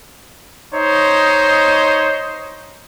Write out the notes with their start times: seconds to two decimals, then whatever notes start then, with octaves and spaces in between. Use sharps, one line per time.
0.74 D#4 C5 C#5 D#5